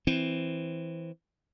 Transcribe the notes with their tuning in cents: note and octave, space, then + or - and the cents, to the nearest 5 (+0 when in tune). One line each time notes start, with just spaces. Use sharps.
E3 +0 C4 +0